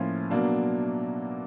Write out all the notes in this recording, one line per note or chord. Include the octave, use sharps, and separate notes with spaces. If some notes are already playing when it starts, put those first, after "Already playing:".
Already playing: A2 F3 A#3 C#4 F4
B2 F#3 A#3 D4